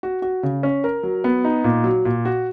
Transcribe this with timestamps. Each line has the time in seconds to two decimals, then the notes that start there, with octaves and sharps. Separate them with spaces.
0.03 F#4
0.22 F#4
0.43 C#3
0.63 C#4
0.84 A#4
1.03 F#3
1.24 B3
1.45 D#4
1.64 A#2
1.84 F#3
2.05 A#2
2.25 F#4